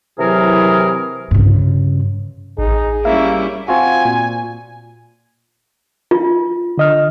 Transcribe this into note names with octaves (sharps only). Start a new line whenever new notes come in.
C3 E3 F#3 E4 G#4 A#4
G2 C#3
A1 D#4 G#4
G3 A#3 C#4 E4 E5
C4 F4 F#4 G#5
A#2
F4
D3 D#5 F6